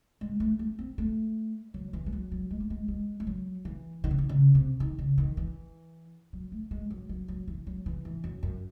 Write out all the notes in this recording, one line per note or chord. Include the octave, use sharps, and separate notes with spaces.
G#3
A3
A3
C4
A3
F#3
E3
G#3
F#3
F#3
G#3
A3
G#3
G#3
G#3
F#3
E3
D#3
C#3
D#3
C#3
C3
D#3
C#3
D#3
E3
F#3
A3
G#3
F#3
F#3
F#3
E3
F#3
E3
E3
F#2
F#2